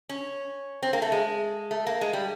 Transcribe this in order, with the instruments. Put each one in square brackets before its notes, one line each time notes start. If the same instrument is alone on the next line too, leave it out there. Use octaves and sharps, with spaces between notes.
[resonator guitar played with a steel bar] C#4
C4
A#3
A3
G#3
A3
A#3
G#3
G3